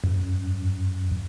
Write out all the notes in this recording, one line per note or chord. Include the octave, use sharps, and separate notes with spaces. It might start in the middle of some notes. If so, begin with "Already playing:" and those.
F#2